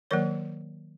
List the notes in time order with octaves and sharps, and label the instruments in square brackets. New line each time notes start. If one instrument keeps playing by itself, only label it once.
[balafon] D#3 F#3 A#3 A#4 C#5